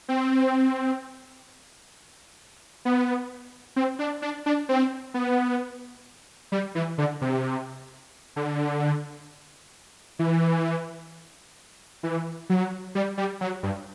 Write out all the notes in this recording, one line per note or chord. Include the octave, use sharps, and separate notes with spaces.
C4
B3
C4
D4
D4
D4
C4
B3
G3
E3
D3
C3
D3
E3
E3
F#3
G3
G3
F#3
G2